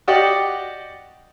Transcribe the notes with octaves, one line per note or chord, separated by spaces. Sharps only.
F#4 G4 D5 D#5 F#5 G5